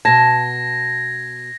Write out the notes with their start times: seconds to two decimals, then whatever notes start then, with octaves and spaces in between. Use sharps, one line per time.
0.05 B2 A5 G#6 A#6